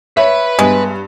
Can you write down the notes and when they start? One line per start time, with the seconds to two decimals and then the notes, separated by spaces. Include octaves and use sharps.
0.17 B4 C#5 E5 B5
0.59 G2 G#3 B3